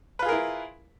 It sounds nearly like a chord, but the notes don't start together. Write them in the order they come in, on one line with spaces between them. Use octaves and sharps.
B4 F4 G#4 A#4 E4